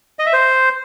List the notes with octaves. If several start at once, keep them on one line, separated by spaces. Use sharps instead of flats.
D#5
E5
C5